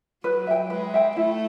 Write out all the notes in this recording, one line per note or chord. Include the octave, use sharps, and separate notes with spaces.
F#3 B4
E5 G5
G#3 B4
E5 G5
A3 E4